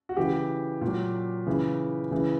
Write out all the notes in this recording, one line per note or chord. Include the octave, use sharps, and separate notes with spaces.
F#4
C#3 E3 G4
A#2
F#3
C#3 E3
C#3 E3